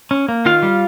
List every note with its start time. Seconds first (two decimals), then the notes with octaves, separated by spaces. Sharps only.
0.11 C#4
0.29 A#3
0.46 D#3 F4 F5
0.63 G3